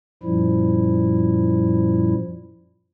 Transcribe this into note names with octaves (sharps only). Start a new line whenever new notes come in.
F#2 A#2 F3 G3 E4